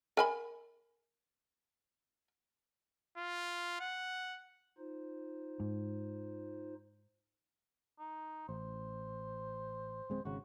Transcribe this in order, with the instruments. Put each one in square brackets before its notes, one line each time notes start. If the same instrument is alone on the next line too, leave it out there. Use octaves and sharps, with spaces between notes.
[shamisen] A#4 G#5 B5
[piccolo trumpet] F4
F#5
[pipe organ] D#4 F4 C5
[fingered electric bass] G#2
[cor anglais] D#4
[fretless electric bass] A1 [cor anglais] C5
[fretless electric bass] D1 G#3 C4
[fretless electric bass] G#1 C#3 [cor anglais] F#4